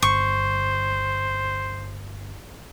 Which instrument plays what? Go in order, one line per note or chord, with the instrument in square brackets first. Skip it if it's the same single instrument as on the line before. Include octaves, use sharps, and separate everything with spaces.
[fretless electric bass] G1 [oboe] C5 [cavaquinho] C#6